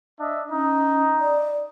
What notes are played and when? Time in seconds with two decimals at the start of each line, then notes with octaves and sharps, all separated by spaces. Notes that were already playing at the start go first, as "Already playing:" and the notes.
0.20 D4 D#5 E5
0.52 C#4 D#4
1.20 D5